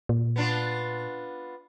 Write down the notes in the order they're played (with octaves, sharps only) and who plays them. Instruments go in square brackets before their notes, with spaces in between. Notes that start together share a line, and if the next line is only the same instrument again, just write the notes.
[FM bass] A#2
[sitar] B3 D4 F4